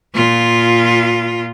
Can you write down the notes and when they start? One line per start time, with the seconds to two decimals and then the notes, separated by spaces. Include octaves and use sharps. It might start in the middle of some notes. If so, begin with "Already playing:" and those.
0.15 A#2 F4